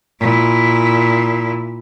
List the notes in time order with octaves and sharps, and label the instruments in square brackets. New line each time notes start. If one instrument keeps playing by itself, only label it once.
[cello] A#2 E4